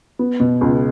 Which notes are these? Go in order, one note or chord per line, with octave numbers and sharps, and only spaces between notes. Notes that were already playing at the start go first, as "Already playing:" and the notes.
B3
B2
C#2